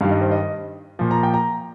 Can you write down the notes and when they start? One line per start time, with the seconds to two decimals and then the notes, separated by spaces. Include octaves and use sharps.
0.01 G2 D#3 G3 F5
0.11 D#5
0.21 C5
0.31 D#5
0.99 A#2 F3
1.11 A#5
1.23 G5
1.34 A#5